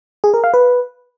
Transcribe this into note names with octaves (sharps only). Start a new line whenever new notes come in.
G#4
A#4
F5
B4